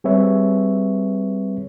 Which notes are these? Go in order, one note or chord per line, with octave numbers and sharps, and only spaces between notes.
G3 C4 G#4 B4 C#5 E5